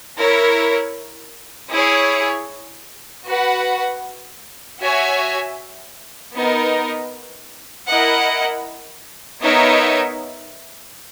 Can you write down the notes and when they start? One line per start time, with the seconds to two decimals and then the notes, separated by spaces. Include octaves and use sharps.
0.18 E4 A#4 C#5
1.72 E4 G#4 C#5
3.26 F#4 B4 F#5
4.81 F#4 C#5 E5 G#5
6.34 B3 D#4 A#4
7.89 E4 A#4 D#5 F#5
9.42 B3 D#4 A#4 C#5 E5